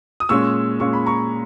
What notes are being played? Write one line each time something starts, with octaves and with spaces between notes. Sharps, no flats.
D#6
A#2 G#3 C#4 C#6 E6
A#2 G#3 C#4 C#6
B5
A#5 C#6